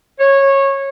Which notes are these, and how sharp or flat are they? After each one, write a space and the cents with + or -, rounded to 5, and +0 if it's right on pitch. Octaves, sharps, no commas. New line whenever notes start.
C#5 -15